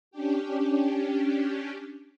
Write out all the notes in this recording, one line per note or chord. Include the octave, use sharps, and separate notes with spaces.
C#4 D4 G4